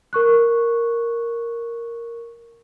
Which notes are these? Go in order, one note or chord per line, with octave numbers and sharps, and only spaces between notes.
A#4 C#6 F#6